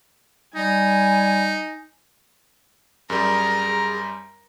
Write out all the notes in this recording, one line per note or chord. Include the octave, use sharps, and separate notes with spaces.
G3 D#4 G#5
F#2 G3 G#4 A#4